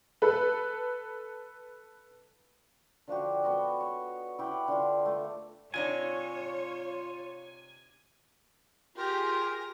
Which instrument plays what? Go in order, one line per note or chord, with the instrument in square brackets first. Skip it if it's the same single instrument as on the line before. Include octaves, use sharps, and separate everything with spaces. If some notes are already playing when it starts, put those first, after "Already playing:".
[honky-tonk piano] A4 B4
[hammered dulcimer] D3 F3 F#4 G4
B3 F#4 D#5
C#5
E4 G4 C#5 F#5
D3 F4
A3
[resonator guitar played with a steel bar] C3 D4 D#4 [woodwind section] F4 [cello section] C#5 [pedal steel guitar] G#5
[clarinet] F4 [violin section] G4 G#4 [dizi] A#4